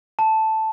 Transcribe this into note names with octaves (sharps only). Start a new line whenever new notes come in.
A5